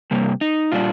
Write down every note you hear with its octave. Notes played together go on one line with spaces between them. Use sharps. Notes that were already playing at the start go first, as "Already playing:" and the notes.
C3 G3 A#3
D#4
A#2 G3 D4 F4